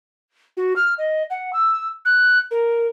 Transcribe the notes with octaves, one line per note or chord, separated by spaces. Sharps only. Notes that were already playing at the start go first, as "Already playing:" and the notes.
F#4
F6
D#5
F#5
E6
F#6
A#4